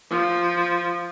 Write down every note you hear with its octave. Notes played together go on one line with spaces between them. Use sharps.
F3